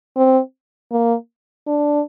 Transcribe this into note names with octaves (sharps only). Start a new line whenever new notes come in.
C4
A#3
D4